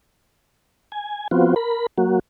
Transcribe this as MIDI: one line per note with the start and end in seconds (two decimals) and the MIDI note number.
0.92 1.28 80
1.31 1.55 53
1.31 1.55 59
1.31 1.55 60
1.31 1.55 65
1.31 1.55 66
1.56 1.86 70
1.56 1.86 83
1.98 2.19 54
1.98 2.19 58
1.98 2.19 66